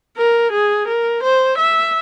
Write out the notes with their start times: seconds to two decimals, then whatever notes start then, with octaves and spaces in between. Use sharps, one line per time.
0.18 A#4
0.52 G#4
0.88 A#4
1.23 C5
1.58 E5